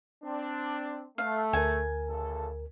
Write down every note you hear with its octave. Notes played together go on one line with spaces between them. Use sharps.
C4 D4
A3 F5
D2 A#4 G#5
A1 C#3 A4